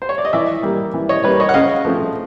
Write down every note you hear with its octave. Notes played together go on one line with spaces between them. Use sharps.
C5
C#5
D5
D#5
E3 D5 E5
G3 A#3
E3
C#5 D#5
G3 A#3 B4 C#5
C#5 D#5
F#5
C#3 D#5 F5
F3 A3 C4